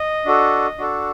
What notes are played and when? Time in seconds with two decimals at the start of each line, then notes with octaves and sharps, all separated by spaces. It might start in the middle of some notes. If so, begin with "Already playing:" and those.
Already playing: D#5
0.25 D4 F#4 A4
0.78 D4 F#4 A4